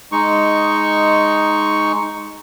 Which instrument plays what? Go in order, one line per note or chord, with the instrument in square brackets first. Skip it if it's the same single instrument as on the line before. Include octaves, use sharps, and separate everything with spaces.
[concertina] G#3 D#4 C#6